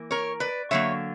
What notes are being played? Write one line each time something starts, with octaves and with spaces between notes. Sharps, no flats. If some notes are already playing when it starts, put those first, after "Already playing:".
Already playing: E3 A#3
A#4 C#5
B4 D5
D3 F#3 A#3 C#5 E5